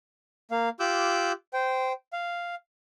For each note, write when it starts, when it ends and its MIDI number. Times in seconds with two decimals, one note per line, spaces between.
0.51 0.69 58
0.51 0.69 77
0.80 1.32 65
0.80 1.32 67
0.80 1.32 86
0.80 1.32 88
0.80 1.32 90
0.80 1.32 91
1.53 1.93 72
1.53 1.93 79
2.13 2.55 77